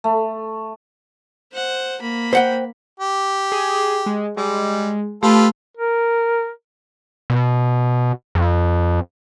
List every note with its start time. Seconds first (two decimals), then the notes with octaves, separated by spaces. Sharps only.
0.04 A3
1.53 C5 F#5
2.01 A#3 B5
2.33 C5 F#5 G5
3.00 G4
3.52 G#4
4.06 G#3
4.37 G3 G#3
5.23 A3 F4 G4 A4 B4
5.77 A#4
7.30 B2
8.35 F2